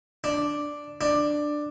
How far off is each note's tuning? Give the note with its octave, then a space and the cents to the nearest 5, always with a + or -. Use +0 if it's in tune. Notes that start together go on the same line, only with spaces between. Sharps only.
D4 +0
D4 +10